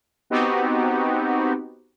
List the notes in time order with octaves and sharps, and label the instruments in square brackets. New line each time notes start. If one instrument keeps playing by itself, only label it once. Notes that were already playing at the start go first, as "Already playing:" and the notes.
[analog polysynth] B3 C4 D#4 F#4 G4